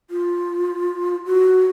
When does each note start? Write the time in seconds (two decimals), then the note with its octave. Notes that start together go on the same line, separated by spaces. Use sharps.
0.10 F4
1.26 F#4